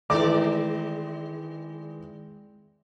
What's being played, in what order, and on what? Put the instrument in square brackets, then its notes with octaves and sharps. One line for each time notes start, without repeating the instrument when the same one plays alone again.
[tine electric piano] D#3 [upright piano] E3 D6 [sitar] G#3 C4 D5